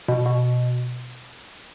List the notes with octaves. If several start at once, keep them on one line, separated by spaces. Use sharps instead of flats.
B2
B2